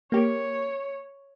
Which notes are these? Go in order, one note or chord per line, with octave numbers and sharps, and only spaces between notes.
A#3 G4 C#5